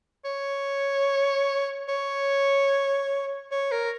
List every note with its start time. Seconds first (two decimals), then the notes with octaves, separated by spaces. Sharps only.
0.24 C#5
1.88 C#5
3.51 C#5
3.72 A#4